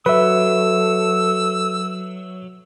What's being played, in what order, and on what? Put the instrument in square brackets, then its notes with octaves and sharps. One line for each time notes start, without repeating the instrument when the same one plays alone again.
[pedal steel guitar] F#3 [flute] A4 [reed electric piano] B4 E5 [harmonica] E6